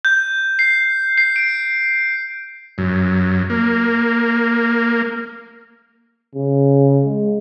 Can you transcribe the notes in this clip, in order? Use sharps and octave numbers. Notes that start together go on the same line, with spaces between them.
G6
C7
C7
D7
F#2
A#3
C#3
G#3